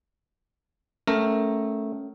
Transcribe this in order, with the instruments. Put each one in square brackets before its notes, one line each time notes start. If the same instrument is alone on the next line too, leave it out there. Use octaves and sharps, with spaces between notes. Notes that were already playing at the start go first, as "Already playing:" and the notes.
[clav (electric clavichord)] A3 A#4 [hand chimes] C#4